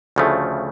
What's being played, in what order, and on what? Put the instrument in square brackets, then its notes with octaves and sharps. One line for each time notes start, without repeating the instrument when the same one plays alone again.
[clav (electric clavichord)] D2 C#3 F3 A3